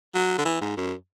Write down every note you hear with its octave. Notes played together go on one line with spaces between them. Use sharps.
F#3
D3
E3
G#2
F#2